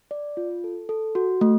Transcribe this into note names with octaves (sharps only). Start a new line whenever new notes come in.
D5
F4
A4
A4
F#4
A3